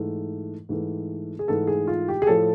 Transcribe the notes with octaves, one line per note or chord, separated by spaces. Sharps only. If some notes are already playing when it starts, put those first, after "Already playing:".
Already playing: G#2 E3 A3
G#2 E3 A3
G#4
G#2 E3 A3 A4
G#4
F4
G4
G#4
A2 F3 A3 A4